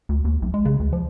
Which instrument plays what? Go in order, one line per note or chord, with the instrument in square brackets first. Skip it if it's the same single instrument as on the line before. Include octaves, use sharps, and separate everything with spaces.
[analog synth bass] D2
D#2
B1
G#3
C#3
D2
F3